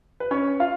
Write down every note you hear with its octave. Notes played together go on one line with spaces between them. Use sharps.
B4
C#4 C#5
F4 F5